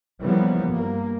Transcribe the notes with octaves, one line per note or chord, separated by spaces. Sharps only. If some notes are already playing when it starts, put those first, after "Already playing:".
C#3 E3 F3 G3 A#3 B3
G2 A#3